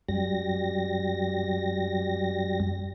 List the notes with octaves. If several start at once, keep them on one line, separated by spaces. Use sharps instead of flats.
F#2 G3 A#6